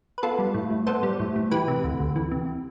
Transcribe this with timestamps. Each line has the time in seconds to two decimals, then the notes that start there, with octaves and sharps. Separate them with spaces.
0.18 B4
0.23 B3 F4 A4
0.39 G3
0.54 A2
0.71 A2
0.87 B3 A4 C5
1.03 G3
1.20 A2
1.36 A2
1.51 E3 G4 B4
1.68 C3
1.84 D2
2.00 D2
2.16 E3
2.32 C3